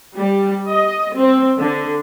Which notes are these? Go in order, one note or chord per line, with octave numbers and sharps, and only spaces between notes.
G3
D#5
C4
D3